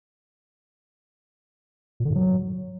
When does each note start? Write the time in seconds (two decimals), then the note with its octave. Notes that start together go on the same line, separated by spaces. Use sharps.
2.00 A#2
2.05 D3
2.10 G#2
2.15 F#3